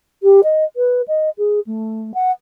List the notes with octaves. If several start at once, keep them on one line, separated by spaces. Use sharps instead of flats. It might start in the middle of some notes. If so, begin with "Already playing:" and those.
G4
D#5
B4
D#5
G#4
A3
F#5